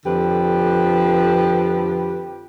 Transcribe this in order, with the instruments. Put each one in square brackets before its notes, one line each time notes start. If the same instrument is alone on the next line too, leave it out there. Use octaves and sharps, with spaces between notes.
[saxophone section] F2 D3 F3 G4 B4